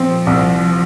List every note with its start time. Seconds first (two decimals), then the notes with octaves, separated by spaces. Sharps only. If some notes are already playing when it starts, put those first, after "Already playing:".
Already playing: F3 C4
0.27 C2